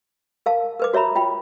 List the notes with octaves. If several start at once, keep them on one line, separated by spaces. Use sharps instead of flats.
A#4 F5 A5
A#4 B4 D6
F#4 C#5 E5 A#5 B5
F4 G5 B5